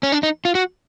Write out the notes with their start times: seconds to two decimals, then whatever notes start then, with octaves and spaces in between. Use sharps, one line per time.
0.03 C#4
0.12 D4
0.23 D#4
0.45 F4
0.55 F#4